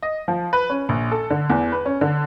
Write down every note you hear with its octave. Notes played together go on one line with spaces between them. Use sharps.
D#5
F3
B4
C#4
A#1
A4
D3
E2
B4
C#4
D3